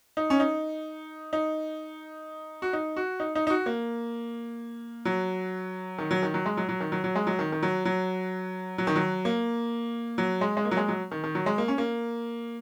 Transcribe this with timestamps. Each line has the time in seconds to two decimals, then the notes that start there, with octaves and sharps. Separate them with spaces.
0.17 D#4
0.30 C#4
0.40 D#4
1.33 D#4
2.62 F#4
2.73 D#4
2.96 F#4
3.20 D#4
3.35 D#4
3.47 D#4
3.50 F#4
3.66 A#3
5.05 F#3
5.98 D#3
6.11 F#3
6.23 D#3
6.34 F#3
6.46 G#3
6.57 F#3
6.69 F#3
6.80 D#3
6.92 F#3
7.04 F#3
7.15 G#3
7.27 F#3
7.39 D#3
7.52 D#3
7.63 F#3
7.85 F#3
8.78 F#3
8.87 D#3
8.96 F#3
9.25 A#3
10.18 F#3
10.41 G#3
10.57 G#3
10.65 A#3
10.71 F#3
10.77 G#3
10.88 F#3
11.11 D#3
11.24 D#3
11.35 F#3
11.46 G#3
11.58 A#3
11.68 C#4
11.78 A#3